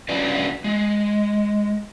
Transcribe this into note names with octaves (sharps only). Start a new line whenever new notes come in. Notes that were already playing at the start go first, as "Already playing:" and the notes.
D3 G3 C#4 F#4 B4 D5
G#3